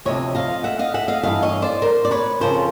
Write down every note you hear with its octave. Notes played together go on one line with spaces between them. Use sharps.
D2 C3 F3 C#5 D#5
D#5 F5
E5 F#5
D#5 F5
E5 F#5
D#5 F5
G2 E3 D#5 F5
C#5 D#5
C5 D5
A#4 C5
D5
B4 C#5
F2 C#3 F3 A#4 C5